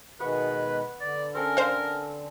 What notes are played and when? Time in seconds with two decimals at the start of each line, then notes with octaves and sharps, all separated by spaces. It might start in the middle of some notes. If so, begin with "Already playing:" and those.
0.20 B2 D#3 G#3 B3 B4 C#5
1.01 D3 D5
1.35 C4 C#4 A4 A#4
1.57 C5 F5